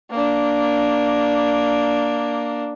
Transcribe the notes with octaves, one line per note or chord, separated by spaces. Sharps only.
A#3 D4